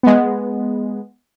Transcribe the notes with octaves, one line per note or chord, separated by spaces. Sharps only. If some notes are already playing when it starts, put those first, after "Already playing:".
G#3 B3